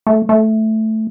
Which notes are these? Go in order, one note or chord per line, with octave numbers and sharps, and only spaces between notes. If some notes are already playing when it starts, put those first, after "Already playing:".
A3
A3